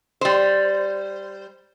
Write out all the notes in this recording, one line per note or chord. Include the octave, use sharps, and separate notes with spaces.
G3 C5